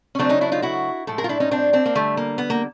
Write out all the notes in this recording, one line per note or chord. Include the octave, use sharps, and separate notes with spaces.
C#4
C#3 F#3 A3 C4 D4
C#4 D#4
D4 E4
D#4 F4
E4 F#4
A2 F3 G#3 A4
G#4 A#4
F4
D4 E4
C#4 D#4
C4 D4
C4 D4
A#3
D3 G3 A3
A#3
B3
A#3